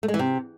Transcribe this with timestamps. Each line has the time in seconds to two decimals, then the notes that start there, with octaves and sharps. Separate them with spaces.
0.03 A3
0.08 G#3
0.14 E3
0.19 C3